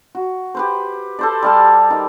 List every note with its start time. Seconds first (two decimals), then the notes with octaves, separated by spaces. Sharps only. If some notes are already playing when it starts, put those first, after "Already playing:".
0.15 F#4
0.55 G4 B4 C5
1.19 A4 C5 D5
1.42 G3 F5 A5
1.90 D#3